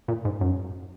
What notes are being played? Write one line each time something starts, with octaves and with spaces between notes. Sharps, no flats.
A#2
G#2
F#2